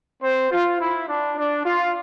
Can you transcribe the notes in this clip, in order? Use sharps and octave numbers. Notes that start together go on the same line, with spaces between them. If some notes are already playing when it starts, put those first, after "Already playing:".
C4 C5
F4
E4
D4
D4
F4